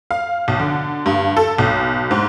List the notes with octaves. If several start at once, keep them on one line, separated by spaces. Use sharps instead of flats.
F5
B1
D3
G2
A4
B1
G#2